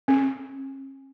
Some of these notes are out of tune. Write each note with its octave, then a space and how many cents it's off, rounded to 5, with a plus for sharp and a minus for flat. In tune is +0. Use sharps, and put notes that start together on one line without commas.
C#4 -45